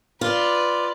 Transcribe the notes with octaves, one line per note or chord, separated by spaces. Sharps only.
F4 B4 D5